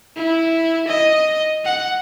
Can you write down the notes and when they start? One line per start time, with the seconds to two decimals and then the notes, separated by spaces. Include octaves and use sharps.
0.17 E4
0.88 D#5
1.65 F#5